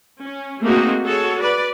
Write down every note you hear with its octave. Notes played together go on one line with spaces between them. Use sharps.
C#4
A3 A#3 C4 D#4 F#4 G#4
F#4 G#4 A4 C#5
B4 D5